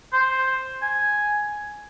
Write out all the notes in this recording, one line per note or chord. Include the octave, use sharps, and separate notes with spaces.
C5
G#5